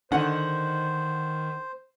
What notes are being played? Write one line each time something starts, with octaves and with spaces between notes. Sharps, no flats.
D3 D#3 C5 F#5